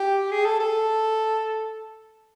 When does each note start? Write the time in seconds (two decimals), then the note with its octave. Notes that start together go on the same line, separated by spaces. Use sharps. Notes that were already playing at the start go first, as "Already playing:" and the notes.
Already playing: G4
0.31 G#4
0.46 A4
0.60 A4